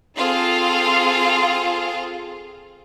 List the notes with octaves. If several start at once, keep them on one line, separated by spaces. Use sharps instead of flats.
C4 F4 G#4 A4 F5